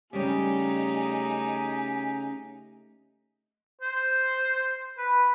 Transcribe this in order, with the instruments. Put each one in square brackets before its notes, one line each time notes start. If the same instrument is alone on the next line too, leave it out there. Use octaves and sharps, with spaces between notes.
[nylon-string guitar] C#3 G3 C#4 [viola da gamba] A3 D#4 [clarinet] G4 [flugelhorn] G#5
[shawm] C5
B4